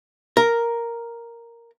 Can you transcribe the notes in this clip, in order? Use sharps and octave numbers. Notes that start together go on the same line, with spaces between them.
A#4